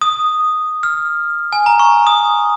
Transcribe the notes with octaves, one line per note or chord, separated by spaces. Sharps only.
D#6
F6
G#5
A#5
C#6
D#6